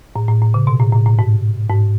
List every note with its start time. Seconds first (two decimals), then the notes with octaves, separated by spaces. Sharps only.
0.16 A2
0.29 A2
0.42 A2
0.54 C#3
0.67 B2
0.80 A2
0.93 A2
1.06 A2
1.19 G#2
1.69 G#2